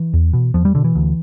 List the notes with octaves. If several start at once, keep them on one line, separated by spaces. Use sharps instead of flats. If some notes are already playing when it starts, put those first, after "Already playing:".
Already playing: E3
E2
B2
E2 F3
G3
B2 D3
E3
D2